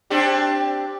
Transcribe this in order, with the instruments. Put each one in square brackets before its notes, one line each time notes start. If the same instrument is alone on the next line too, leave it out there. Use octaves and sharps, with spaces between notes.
[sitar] C4 D4 G4